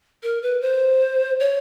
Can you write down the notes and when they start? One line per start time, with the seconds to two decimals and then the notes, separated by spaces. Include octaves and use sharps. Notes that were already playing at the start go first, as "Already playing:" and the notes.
0.23 A#4
0.42 B4
0.62 C5
1.40 C#5